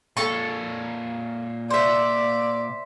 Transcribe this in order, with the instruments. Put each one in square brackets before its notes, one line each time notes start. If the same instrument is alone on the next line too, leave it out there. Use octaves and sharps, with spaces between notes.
[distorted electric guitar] A#2 C#5 [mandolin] A4 A5 C#6
[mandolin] C5 E5 [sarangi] D5